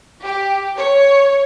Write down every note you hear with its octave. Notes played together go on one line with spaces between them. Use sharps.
G4
C#5